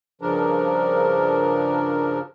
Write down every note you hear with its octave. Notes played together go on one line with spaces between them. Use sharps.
G2 C#3 F3 D4 A#4